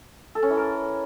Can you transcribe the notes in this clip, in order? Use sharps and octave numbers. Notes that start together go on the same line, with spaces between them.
A4
C#4
E3
A#4